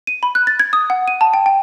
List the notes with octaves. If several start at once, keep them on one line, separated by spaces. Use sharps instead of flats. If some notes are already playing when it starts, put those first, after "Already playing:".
D#7
B5
F#6
A6
G#6
D#6
F#5
D#7
A5
G5
G5